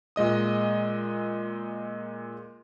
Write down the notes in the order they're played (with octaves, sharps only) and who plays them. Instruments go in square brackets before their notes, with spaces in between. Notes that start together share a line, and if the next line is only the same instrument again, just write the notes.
[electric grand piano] A#2 G#3 D#5 D#6